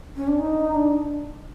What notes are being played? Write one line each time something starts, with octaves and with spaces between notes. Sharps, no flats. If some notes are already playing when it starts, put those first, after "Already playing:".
C#4
D4
D#4
D4